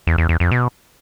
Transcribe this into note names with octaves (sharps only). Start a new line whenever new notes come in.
E2
E2
E2
F2
B2